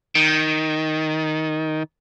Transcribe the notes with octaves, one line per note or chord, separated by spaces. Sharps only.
D#3